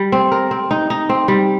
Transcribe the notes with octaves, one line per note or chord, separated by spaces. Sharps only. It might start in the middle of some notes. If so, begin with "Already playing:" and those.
Already playing: G3
C4
A#4
C4
D#4
D#4
C4
G3